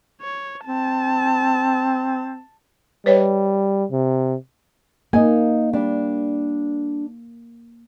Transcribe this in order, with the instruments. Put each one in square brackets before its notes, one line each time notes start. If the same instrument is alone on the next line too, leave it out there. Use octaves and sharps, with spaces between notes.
[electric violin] C#5
[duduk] C4 [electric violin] A5
[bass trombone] G3 [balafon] B4 C#5 D#5
[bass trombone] C3
[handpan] A#3 [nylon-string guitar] D#4 D#5 G#5
[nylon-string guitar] G3 D4